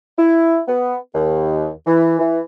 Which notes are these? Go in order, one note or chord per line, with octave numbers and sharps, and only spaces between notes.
E4
B3
D#2
E3
E3